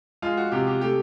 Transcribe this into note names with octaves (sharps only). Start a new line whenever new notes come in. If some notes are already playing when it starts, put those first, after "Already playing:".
G#3 F4
F#4
C3 G4
G4
A3 G4